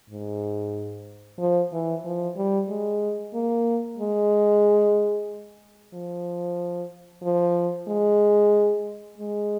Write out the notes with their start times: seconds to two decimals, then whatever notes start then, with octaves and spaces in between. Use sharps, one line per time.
0.10 G#2
1.39 F3
1.73 E3
2.05 F3
2.37 G3
2.69 G#3
3.34 A#3
3.98 G#3
5.94 F3
7.23 F3
7.88 G#3
9.18 G#3